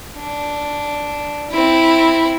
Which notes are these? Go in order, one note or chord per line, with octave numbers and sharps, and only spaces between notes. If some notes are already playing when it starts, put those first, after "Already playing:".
D4
C4 E4